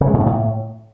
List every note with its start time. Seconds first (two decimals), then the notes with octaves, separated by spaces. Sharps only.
0.01 C#3
0.07 G#3
0.14 A#2
0.20 G#2
0.26 A2